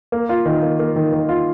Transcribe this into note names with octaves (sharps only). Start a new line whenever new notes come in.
A#3
F4
D#3
A#3
A#3
D#3
D#3
F4